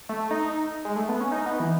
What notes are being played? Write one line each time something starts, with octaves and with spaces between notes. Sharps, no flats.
A3
D#4
G#3
A3
B3
C#4
D#4
B3
E3